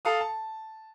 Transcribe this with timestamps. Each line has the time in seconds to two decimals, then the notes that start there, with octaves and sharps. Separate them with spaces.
0.05 A4 F5 D#6
0.21 A5